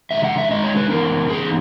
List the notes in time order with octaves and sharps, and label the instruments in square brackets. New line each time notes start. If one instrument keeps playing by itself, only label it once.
[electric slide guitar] D#3 G#3 D#4 E5
F#5
E5
D#3 G#3 D#4 D#5
C#5
B4
E3 B3 D#4 A#4
E3 B3 D#4 G#4